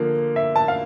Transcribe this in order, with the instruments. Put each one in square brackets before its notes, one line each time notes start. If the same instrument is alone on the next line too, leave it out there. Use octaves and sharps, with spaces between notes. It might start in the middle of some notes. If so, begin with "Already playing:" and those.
Already playing: [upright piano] D3 F3 A#3
E5
A5
F5